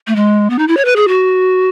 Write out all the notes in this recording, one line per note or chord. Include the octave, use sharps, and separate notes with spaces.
A3
G#3
B3
D#4
E4
C#5
B4
G#4
F#4